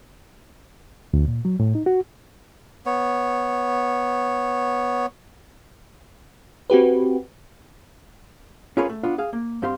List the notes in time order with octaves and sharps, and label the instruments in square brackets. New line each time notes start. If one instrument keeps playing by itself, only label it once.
[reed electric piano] D2
A#2
F#3
A2
D#4
F#4
[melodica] B3 C#5
[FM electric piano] C4 F#4 G4 B4
[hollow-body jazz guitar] C#4 F4 G#4 A#4 B4 C#5
A3
B3 D4 F4
G#4 F5
A#3
G2 C4 G4 F5 C6